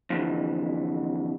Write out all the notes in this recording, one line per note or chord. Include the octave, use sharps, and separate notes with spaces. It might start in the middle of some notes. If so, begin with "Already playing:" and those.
F2 D3 E3